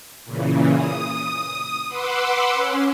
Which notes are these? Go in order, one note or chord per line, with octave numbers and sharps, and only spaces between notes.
A#2 C#3 E3
D#6
B4 F#5 C6 D6 E6
C#4